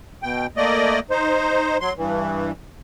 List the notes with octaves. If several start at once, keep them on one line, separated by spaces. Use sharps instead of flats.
B2 G5
A3 A#3 D5 D#5
D#4 C5
F#3 C6
G2 E3